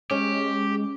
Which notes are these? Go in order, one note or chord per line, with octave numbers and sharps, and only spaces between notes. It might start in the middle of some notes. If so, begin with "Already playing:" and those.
G#3 C#4 G4